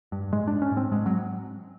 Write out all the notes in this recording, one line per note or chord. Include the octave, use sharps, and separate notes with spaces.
G2
G#2 G#3
G#2 D4
C#4
G#2
C4
G#2 G#3
F#3